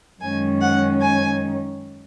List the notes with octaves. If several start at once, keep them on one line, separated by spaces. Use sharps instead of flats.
F#2 D#3 G#3 C#4 G#5
F#5
G#5